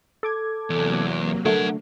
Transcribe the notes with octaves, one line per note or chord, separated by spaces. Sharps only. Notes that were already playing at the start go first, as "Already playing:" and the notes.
A4 D6 G#6
E2 C3 F#3 A#3
D3 F#3 A3 A#4 F#5